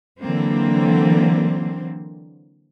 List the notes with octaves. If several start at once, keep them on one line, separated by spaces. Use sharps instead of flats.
D3 E3 F#3 A#3 C4